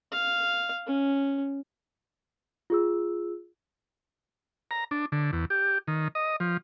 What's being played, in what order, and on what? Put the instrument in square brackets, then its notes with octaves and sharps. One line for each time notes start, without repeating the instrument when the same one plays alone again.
[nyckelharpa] F5
C#4
[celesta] F4 G#4 E6
[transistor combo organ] A#5
D4
D3
E2
G4
D#3
D#5
F3